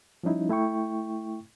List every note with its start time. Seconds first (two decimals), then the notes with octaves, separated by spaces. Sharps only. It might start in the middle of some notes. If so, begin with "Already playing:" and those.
0.23 F3 G3 C#4 D#4 E4
0.49 A3 E4 G5 C#6